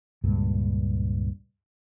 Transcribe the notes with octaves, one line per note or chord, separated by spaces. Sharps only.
C#2 G2 A#2 G#3